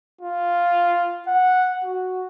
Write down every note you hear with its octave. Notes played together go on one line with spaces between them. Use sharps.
F4
F#5
F#4